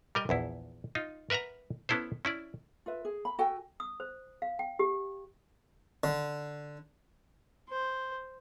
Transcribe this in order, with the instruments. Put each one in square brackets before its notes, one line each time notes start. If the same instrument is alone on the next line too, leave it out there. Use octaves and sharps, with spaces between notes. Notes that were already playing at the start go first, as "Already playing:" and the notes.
[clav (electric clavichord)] G3 A#4 D#5
A#1 E2 E4
D#4 F4
A#4 B4 E5 F#5 A#5
B3 C#4 E4 A4 C5
C#4 E4 D5
[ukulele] F4 B4 E5
G#4
B5
F#4 A4 G5 G#5
[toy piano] D#6
C5
F5
G5
G4
[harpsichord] D3
[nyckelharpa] C5